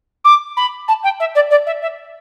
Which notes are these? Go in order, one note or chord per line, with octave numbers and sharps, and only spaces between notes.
D6
B5
A5
G5
E5
D5
D5
E5
E5